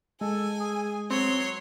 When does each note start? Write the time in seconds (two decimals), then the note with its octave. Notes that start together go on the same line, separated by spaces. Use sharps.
0.21 G#3 A4 G#5
0.61 G#4
1.11 F#3 C4 C#5 C6